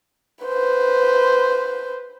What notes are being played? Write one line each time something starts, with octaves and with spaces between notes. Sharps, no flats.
B4 C5